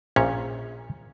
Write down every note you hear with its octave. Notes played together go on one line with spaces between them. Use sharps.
A#1 A#2 C#4 C#5